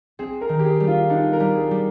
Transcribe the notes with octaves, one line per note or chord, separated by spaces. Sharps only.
C4 G#4
A#4
D#3
G4
G#4
G3
F4
D4 D#4
A#4
G3
G#4
G3